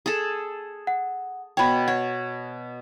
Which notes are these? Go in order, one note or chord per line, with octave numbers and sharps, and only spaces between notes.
G#4 A4
F#5
B2 C#5 G5 B5
C#5 F#5